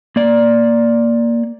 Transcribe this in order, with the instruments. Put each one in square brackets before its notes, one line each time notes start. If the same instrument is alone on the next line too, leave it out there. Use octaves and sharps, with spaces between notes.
[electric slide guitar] A#3 D5